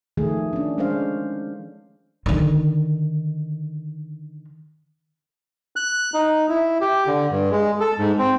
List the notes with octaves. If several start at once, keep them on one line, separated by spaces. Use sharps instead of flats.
D#3 F3 A3 G#4
C#4 D4
G#3 C#4 D4 C5 F5
D3 D#3
F#6
D#4
E4
G4
D3
G2
G#3
A4
G#2
C4